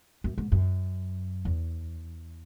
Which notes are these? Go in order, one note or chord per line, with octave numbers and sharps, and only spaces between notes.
F#2
G#2
F#2
E2